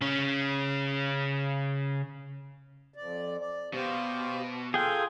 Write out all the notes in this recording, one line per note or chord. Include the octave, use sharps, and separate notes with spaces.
C#3 C#4
F2 D5
D5
B2 G4 C5 F5
F4 G#4 A4 F5 G5